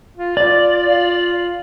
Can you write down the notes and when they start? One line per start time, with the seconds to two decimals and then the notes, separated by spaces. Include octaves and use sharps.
0.17 F4
0.37 F4 D5
0.89 F4